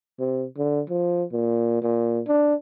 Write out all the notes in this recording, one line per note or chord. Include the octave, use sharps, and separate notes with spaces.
C3
D3
F3
A#2
A#2
D4